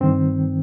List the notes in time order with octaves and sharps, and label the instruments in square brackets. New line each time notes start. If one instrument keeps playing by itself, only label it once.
[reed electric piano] G2 D#3 C4